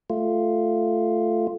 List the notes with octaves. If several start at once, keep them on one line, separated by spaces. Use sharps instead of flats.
A3 F4